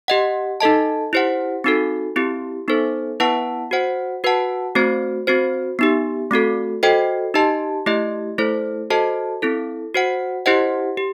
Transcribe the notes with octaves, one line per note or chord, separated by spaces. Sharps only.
G4 D#5 F#5
D#4 A4 D#5 A5
E4 G4 C5 F#5
C4 D#4 F#4 A4
C4 E4 G4
B3 D#4 A4 C5
B3 E4 B4 F#5 A5
F#4 C5 F#5
F#4 B4 F#5 A5
A3 C4 F#4 C5
C4 F#4 C5
B3 D#4 G4
A3 C4 F#4 A4
F#4 A4 C5 D#5 G5
D#4 G4 D#5 A5
A3 E4 G4 D#5
A3 E4 A4 C5
F#4 A4 C5 D#5 A5
C4 E4 A4
F#4 C5 F#5
E4 G4 C5 D#5 F#5
G4